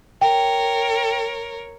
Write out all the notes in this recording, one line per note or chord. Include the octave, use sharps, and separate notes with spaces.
A#4 C#5 G5